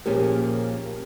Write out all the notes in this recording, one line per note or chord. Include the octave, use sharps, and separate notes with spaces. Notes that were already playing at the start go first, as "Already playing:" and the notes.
A#2 F3 A#3 C#4 G4 G#4 A#4